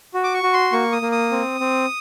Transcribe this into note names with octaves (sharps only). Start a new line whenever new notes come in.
F#4
D6
C#6
F#4
C6
A#3 C#6
D#6
A#3
D#6
C4
C4